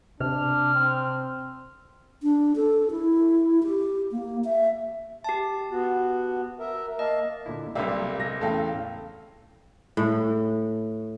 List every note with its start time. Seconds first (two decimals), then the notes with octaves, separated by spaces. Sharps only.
0.20 C3 D4 F6
0.74 C4
2.23 D4
2.56 A4
2.91 E4
3.63 G4
4.12 A#3
4.45 E5
5.24 G4 A5
5.72 B3 F#4
6.59 A#4 E5
6.99 A#3 D#5 F5 A5
7.46 A#2 D3 E4
7.75 B1 C3 G3 A#3 D5 E5 F5
8.20 G#3 A#6
8.41 E2 A2 C#3 A4 F5 G5
9.97 A2